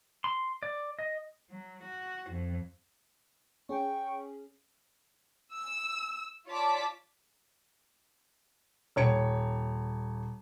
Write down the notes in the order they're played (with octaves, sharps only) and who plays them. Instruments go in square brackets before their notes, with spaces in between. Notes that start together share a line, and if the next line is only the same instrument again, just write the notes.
[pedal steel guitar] C6
D5
D#5
[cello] F#3
F#4
F2
[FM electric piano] C#4 G#4 [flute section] G5 C#6
[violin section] E6
F4 C#5 D5 A5 D6 B6
[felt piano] D#1 C#5 C#7